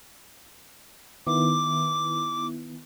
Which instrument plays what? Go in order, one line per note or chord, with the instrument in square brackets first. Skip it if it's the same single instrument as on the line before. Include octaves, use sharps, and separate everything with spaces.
[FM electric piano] D#3 B3 E4 [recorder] D6